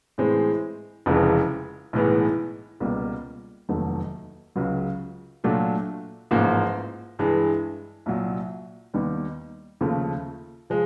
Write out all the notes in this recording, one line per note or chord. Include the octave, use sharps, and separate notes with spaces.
A2 E3 G#3 C4
F1 F2 C#3 E3 G#3
B1 A2 E3 G#3 B3
C#2 B2 G3 A#3
F1 D#2 D#3 F#3 A3
C#2 C#3 F#3
A#2 F#3 A3 D4 F4
A1 G#2 F3 A#3
G2 E3 G#3
C2 A#2 F#3
D#2 D#3 G3 B3
D#2 C#3 F3 A3
F3 G#3